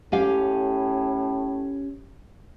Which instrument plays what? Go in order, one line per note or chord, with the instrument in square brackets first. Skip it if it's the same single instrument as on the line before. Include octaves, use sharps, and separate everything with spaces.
[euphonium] A2 [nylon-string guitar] C#4 G4 F5